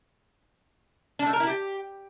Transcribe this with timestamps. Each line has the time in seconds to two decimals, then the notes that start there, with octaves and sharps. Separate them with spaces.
1.19 D4
1.26 A3
1.33 A#4
1.40 E4
1.47 G4